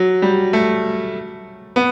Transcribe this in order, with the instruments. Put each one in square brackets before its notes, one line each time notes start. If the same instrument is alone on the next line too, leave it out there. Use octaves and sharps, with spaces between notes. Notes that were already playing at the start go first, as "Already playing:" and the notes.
Already playing: [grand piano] F#3
G3
A3
B3